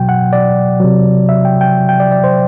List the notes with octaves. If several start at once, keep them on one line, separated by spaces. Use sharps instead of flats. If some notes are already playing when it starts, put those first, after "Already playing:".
Already playing: B2 F#3 G5
F#5
D5
C3 F#3
E5
G5
G5
G5
D5
D5
C5